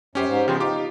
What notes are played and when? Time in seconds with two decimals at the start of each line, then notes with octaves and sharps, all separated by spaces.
0.15 F#2 C#4 G4 C5
0.27 G#2
0.48 C#3 F3 B3 G4 C5
0.60 D#4 F4 G4 D6